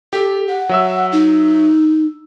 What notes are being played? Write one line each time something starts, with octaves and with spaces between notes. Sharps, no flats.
G4 A4
F#5
F#3 E5 E6
D#4